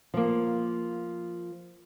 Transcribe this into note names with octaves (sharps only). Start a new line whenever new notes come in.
F3 A#3